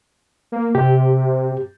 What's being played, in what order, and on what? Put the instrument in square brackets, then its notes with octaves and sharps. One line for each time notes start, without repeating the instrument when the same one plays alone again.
[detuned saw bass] A#3
[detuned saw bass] C3 [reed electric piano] G4